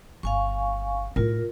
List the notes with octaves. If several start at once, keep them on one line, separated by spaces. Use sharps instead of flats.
G1 F5 G#5 C#6
A2 D#4 F4 A#4